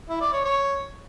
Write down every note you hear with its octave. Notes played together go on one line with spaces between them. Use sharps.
E4
D5
C#5
C#5